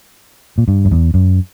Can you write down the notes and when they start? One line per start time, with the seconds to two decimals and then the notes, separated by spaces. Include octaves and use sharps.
0.58 A#2
0.68 G2
0.85 F#2
0.91 E2
1.14 F#2